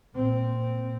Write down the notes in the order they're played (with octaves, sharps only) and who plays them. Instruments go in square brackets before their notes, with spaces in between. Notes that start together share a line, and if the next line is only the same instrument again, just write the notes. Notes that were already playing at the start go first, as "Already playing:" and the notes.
[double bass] A#2 C4